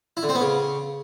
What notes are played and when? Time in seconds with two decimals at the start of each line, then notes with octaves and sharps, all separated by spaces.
0.17 E4
0.23 D3
0.29 C4
0.35 B3
0.41 C#3